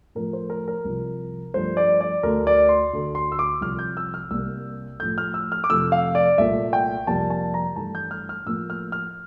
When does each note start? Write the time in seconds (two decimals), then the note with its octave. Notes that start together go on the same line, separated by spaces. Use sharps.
0.15 A2 F3 A3 A#4
0.33 C5
0.50 A#4
0.68 A#4
0.85 C2 C3 F3
1.54 G2 F3 A3 C5
1.77 D5
2.01 D5
2.23 D2 D3 A3 A#4
2.47 D5
2.69 C6
2.93 D2 D3 A3
3.15 C6
3.32 E6
3.39 D6
3.61 C2 C3 F3 F6
3.79 G6
3.97 E6
4.14 F6
4.31 C2 C3 G3 A#3 E6
4.99 A2 F3 A3 G6
5.18 F6
5.34 E6
5.52 F6
5.64 D6
5.69 F2 C3 F3 A3 E6
5.92 F5
6.15 D5
6.38 C2 A#2 A3 E5
6.73 G5
7.07 F2 C3 G3 A#3 A5
7.30 A5
7.54 A#5
7.76 G2 E3 A3 A5
7.95 G6
8.11 F6
8.29 F6
8.46 A2 F3 A#3 E6
8.70 F6
8.92 F6